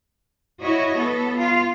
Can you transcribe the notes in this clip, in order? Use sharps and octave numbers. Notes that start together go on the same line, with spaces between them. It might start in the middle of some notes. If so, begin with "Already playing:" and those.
E4 F#4 C#5 D#5
B3 A4
F4